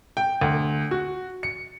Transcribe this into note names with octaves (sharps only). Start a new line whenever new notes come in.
G5
D2
F#4
C#7